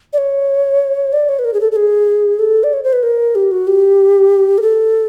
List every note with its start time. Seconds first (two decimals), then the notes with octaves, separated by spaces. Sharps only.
0.13 D5
0.18 C#5
1.13 D5
1.29 C#5
1.39 B4
1.45 A#4
1.54 G#4
1.61 A4
1.72 A4
1.76 G#4
2.39 A4
2.64 D5
2.73 C#5
2.83 C5
2.93 B4
3.03 A#4
3.35 G4
3.51 F#4
3.67 G4
4.58 A#4
4.62 A4